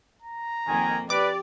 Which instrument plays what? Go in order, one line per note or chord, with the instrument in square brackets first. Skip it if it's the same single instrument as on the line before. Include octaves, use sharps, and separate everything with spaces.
[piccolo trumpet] A#5
[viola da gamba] F2 A#3 [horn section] D#3 G#5
[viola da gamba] G4 [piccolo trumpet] B4 [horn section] D5 [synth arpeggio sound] D6